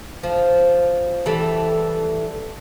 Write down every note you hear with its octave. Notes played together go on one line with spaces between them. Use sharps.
F3
E3 G3 A3